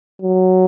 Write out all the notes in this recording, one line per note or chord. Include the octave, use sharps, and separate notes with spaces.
F#3